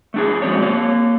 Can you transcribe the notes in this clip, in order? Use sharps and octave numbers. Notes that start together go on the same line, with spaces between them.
A3 D4 G#4
F2 F#3 G#3 C4 C#5
A#3 C#5